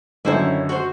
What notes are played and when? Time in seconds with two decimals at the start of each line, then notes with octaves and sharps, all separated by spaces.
0.25 F#2 D3 D#3 E4 C5 C#5
0.69 F#4 C5